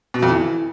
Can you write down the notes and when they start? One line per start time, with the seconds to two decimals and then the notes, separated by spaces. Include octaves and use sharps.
0.14 B2
0.22 F2
0.31 E3